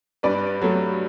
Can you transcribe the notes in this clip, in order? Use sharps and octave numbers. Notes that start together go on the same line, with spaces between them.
G2 B4 D5
F#3 A3